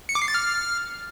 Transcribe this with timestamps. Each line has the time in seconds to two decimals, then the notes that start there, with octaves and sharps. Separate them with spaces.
0.09 C#7
0.15 D6
0.22 C7
0.28 A6
0.34 F6